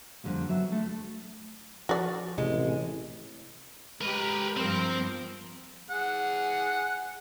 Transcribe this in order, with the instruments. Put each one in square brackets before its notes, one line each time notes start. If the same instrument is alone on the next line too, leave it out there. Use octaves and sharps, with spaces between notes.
[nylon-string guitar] F2 D3 G3 A#3
F#3 B3 E5
D3 A3 A4
[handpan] F3 [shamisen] F#4 D5
[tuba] A1 [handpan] C3 E4 [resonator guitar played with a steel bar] G#3
[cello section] G#3 G4 [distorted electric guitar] A#4 B4
[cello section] G2 F3 A#4 [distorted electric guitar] C4
[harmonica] G#4 F#5